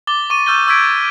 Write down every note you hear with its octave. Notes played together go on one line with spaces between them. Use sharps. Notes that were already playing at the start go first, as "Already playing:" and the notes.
D6 A6 G7
C#6 D6 D#7
C#6 E6 F6 G6 A6 G7
C#6 E6 G6 G#6 B6 D7